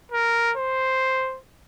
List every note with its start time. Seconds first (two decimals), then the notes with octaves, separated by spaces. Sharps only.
0.12 A#4
0.57 C5